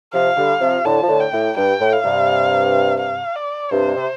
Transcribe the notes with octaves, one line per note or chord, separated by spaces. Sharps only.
C3 F3 F5
D3 G3
C3 F3
A2 D3 A5
F3
A2 D3
G5
A2
G2 G5
A2
F5
G2 C3
F5
D5
G2 C3 C5
C3